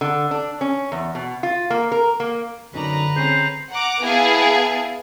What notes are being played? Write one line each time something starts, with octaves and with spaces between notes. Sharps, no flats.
D3
D4
C#4
E2
B2
F4
A#3
A#4
A#3
F#2 D3 D#4 B4 D5 A#5
C4 C#4 G#4 C5
F#5 A#5 D6
B3 E4 G#4 F5 G#5 A5